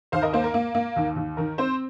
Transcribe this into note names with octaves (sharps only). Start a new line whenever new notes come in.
D#2 C5 F5
A#4 D#5
A#3 C5
A#4
A#3
A#3
D#2
D#2
D#3 A#4
C4 C5